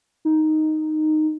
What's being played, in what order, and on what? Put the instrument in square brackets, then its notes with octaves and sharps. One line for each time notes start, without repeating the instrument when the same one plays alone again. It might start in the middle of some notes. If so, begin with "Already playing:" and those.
[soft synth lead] D#4